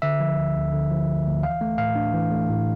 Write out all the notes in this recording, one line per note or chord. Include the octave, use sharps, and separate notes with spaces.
D3 E5
F3
D2
D2
D3
F3
D2
D2
E3 F5
A3
A2 F5
D4
E3
A3
A2